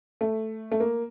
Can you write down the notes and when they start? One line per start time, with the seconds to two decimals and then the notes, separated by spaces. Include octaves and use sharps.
0.21 A3
0.71 A3
0.80 A#3